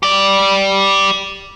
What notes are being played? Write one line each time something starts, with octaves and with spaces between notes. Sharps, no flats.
G4 D5